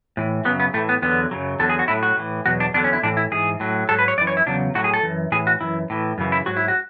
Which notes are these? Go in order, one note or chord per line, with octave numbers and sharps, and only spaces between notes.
A2 E3
F#2 C#3 F#3 B3
B3
A2 E3 A3
B3
E2 D3 F#3 B3
F#2 C#3 F#3
E2 D3 F#3 A4
G#4
F#4
A2 F#3 E4
F#4
A2 E3
E2 B2 F#3 F#4
D4
E2 D3 F#3 D4
C#4
E4
A2 E3 D4
E4
G#2 E3 G#4
A2 F#3
G#2 F#3 A4
B4
C#5
F#2 E3 D5
C#5
E4
E2 C#3 F#3 D4
A2 F#3 F#4
G#4
A4
F#2 E3
A2 E3 G#4
F#4
F#2 E3 E4
A2 E3
F#2 C#3 E3
E4
G#2 F#3 F#4
E4
F#4